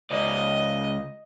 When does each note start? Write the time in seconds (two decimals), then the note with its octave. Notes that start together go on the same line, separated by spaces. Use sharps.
0.11 C#2 D5 D#5